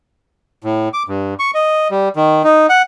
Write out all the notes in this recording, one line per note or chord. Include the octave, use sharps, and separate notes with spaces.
A2
D6
G2
C#6
D#5
G3
D#3
D#4
F#5